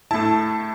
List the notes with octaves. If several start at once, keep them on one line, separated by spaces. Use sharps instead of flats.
A2 A3 E4 A5